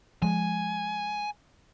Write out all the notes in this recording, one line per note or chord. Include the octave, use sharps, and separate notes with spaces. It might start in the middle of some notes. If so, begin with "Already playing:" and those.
F3 G#3 G#5